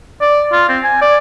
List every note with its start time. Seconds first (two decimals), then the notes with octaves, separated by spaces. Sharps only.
0.21 D5
0.52 F4
0.69 C4
0.84 G#5
1.01 D5